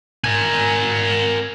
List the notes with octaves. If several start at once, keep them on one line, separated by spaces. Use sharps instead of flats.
A#4 G#5